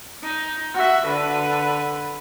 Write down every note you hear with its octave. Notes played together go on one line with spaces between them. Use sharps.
D#4
F#4 E5
D3 B4